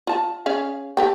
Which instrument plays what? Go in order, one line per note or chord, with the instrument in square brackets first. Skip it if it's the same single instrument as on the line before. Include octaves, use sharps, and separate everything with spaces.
[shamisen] F4 A5
C#4 G#4 F5
G4 A4 G5